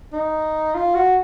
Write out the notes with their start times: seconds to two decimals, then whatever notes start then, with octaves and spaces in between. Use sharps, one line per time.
0.13 D#4
0.75 F4
0.95 F#4